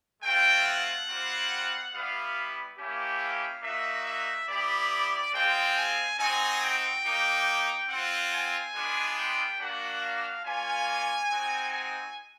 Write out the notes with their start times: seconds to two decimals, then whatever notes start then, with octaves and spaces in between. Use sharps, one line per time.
0.23 A3 C4 F4 G5
0.66 F#5
1.08 G3 C4 F4
1.93 G3 B3 E4 F5
2.78 A#3 C#4 E4 G4
3.21 F5
3.63 A#3 D#4 F#4 E5
4.05 E5
4.48 B3 E4 G4 D5
5.33 G#3 C4 F4 G5
5.77 G#5
6.18 C4 D#4 F#4 G#5
6.62 G5
7.04 A#3 D#4 G4
7.89 C4 F4 F#5
8.32 G#5
8.74 G#3 B3 D4 F4
9.18 G5
9.59 A#3 D4 F#4 F#5
10.02 F5
10.45 A#3 C#4 F4 G#5
11.30 C4 D#4 F#4
11.72 G#5